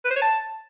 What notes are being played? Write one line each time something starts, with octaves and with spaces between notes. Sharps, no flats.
B4
C5
C#5
A5